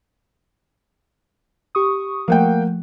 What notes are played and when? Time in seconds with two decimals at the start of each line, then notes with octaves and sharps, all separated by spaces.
1.75 G4 C#6 D#6
2.28 F3 A3 A#3 F#5 G5